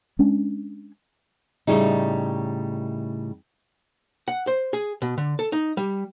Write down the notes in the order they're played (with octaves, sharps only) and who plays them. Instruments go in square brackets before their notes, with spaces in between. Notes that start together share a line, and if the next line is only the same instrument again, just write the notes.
[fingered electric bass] G#3 C#4 D4
[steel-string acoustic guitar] A2 C#3 G3 D#4
[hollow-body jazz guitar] F#5
C5
G#4
B2
D3
A4
D#4
G3